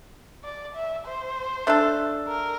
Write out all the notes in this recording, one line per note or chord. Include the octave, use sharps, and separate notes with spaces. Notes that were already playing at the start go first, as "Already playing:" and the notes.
D5
E5
C5
A3 D4 A4
A#4